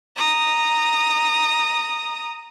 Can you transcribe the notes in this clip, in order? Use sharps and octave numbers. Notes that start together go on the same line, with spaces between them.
A#5 D#6